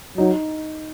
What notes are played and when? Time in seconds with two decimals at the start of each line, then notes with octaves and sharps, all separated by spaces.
0.17 F#3 D#4